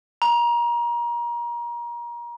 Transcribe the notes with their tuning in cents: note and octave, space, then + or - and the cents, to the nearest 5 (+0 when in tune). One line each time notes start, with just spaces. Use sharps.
A#5 +30